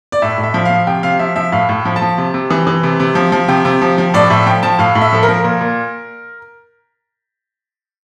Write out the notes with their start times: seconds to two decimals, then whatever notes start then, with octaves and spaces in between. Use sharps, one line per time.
0.12 D5
0.22 A2 E5
0.38 A2
0.43 E5
0.54 F3
0.65 F3 F5
0.87 C3 G5
1.03 C3 F5
1.19 F3 E5
1.36 F3 E5
1.52 A2 F5
1.69 A2
1.85 F3
1.96 A5
2.02 F3
2.18 C3
2.34 C3
2.50 E3
2.67 E3
2.83 C3
3.00 C3
3.15 F3
3.32 F3
3.48 C3 G5
3.65 C3
3.82 F3
3.98 F3
4.14 A2 D5
4.30 A2 E5
4.46 F3 G5
4.63 F3 A5
4.79 A2 F5
4.95 A2
5.02 E5
5.12 F3 A4
5.23 A#4
5.29 F3
5.44 A#2 A#4
5.61 A#2